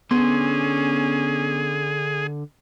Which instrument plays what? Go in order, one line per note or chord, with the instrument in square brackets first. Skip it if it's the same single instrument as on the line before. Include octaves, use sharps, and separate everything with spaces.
[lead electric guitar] D3 C6 [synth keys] B3 [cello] C#4 [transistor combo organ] G#4